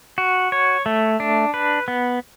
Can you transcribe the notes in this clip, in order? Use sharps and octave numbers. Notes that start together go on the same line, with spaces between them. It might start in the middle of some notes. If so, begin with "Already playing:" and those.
F#4
C#5
A3
D4
B4
B3